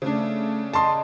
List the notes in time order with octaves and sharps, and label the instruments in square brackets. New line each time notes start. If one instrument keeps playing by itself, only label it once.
[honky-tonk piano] C#3 D4 [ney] A3
[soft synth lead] D#5 [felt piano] A5 C6